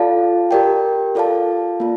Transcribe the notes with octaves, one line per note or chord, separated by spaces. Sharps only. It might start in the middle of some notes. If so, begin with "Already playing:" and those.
Already playing: F4 A4 D5 F5 A5
G4 A#4 D5 G5
F4 A4 D5 F5 A5
A#3 F4